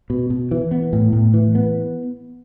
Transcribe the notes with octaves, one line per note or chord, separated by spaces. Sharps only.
B2
B2
E3
B3
A2
A2
E3
B3